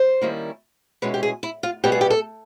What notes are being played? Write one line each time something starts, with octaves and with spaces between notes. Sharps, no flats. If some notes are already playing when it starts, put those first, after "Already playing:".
Already playing: C5
D#3 G3 A#3 C#4 E4
B2 G#3 C#4 E4 B4
G4
G#4
E4
F4
B2 G3 B3 E4 G4
G#4
G4
A4